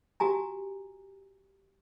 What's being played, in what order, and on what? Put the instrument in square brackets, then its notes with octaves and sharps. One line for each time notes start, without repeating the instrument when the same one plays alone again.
[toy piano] F#4 G4 G#5 A#5